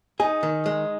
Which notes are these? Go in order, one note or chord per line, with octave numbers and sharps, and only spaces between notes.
D#4 G#4
D#3
G#3